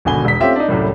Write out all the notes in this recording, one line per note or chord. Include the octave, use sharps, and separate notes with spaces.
G#1 B2 D3 G#5 G7
E1 B6
A3 C4 C#4 F4 G4 E5
D4 D#4
C2 F#2 A2 G3